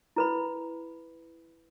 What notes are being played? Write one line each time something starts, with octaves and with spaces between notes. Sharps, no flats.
E4 B4 B5